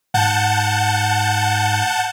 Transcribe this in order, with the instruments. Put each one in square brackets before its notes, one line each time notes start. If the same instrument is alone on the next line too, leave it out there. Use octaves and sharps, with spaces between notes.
[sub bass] G#2 [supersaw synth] F#5 A5 G6